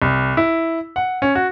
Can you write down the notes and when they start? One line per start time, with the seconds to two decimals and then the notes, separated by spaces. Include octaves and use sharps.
0.02 C2
0.37 E4
0.96 F#5
1.22 C#4
1.35 F#4